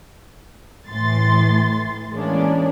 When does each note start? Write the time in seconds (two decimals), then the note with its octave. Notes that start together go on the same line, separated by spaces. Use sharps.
0.90 A2 E3 C6 A6
2.12 E3 G#3 A#3 C#4 D4